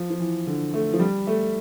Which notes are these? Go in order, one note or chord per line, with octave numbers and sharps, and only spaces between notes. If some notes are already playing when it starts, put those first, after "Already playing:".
Already playing: F3
F3
E3
D3
A3
F3
G3
A3